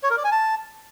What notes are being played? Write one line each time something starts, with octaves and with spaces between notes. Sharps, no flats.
C#5
A#4
D5
G#5
A5